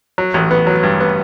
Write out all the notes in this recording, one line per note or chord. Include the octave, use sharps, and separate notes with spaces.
F#3
A1
B3
F#3
G2
B3